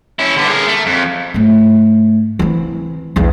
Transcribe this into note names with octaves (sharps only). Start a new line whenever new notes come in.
C#4 E4
D3 B3
G#4 A#4
A3
F2
G#2 A3
E3 C4
B1 E2